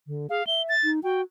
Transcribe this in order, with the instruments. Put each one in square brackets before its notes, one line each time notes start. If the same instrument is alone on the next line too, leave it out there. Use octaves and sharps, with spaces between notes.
[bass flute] D3
[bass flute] G#4 [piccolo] F5
[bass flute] E5 [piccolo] G7
[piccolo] A6
[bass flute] D#4
[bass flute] F#4 [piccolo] G5